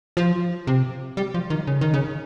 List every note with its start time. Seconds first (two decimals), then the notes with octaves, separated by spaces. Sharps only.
0.17 F3
0.67 C3
1.17 G3
1.34 F3
1.50 D#3
1.67 C#3
1.81 D#3
1.94 C#3